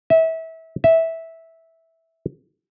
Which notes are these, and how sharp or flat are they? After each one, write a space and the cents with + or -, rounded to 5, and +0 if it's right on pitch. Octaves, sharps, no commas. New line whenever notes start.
E5 -25
E5 -10